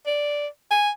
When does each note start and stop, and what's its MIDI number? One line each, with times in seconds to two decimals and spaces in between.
0.06 0.47 74
0.71 0.90 80